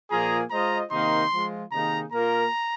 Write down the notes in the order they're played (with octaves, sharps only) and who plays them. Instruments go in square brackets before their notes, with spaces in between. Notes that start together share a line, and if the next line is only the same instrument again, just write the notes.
[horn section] A#2 F3 A#3 F4 G#4 [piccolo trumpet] A#5
[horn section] G#3 F4 C5 D#5 [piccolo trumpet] A#5
[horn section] C3 D#3 A#3 D#4 [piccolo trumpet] C6
[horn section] F3 G#3 F4
[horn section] C3 D#3 A#3 D#4 G#4 [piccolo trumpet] A#5
[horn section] A#2 A#3 F4 A#4 [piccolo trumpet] A#5